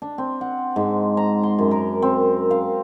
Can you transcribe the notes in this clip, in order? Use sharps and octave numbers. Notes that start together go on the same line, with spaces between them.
D4
C4
F#5
G#2
A#5
C6
F#2
A#4
C4
F5